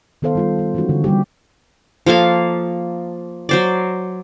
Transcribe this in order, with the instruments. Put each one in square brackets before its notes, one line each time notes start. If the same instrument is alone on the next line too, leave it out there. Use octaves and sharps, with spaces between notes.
[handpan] D#3 B3 A4 C5 F5
G3 F4 A4
A4
E3 G#3 C#4 D#4 F#4
D3
G3 A#3 G4
[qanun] F3 A#3 A4 F5
F#3 C5 D5